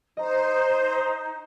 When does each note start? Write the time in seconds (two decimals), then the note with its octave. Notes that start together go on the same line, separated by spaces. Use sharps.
0.17 D#4 C5 D#5 A#5